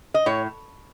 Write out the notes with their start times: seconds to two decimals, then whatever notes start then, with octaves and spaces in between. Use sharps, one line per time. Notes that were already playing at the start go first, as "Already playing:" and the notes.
0.14 D#5
0.26 A2 C#5